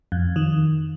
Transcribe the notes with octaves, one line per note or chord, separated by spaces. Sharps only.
F2
D#3